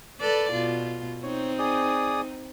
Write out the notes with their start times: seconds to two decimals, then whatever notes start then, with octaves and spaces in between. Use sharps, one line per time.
0.20 A4 B4 D5
0.52 B2 F4
1.23 C4 D#4 C#5
1.59 G#4 D5 D#6